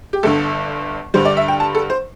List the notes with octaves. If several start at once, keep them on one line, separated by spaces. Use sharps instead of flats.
G4
G1 G2 D3 A4
G2 D3 G3 C5
D5
E5
G5
A5
A4
C5